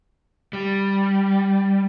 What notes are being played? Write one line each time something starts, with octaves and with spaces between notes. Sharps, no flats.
G3